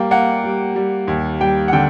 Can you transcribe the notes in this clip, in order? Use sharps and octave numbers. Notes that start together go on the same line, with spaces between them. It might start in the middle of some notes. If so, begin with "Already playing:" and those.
Already playing: G3 A#3 G5
A#3 F#5
G3
G3
D#2
G3 G5
F#5
D3 G5